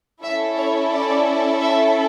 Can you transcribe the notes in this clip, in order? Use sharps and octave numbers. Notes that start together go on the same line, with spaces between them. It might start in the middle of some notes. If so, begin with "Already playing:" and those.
C#4 E4 A4 E5
C#5
D5
E5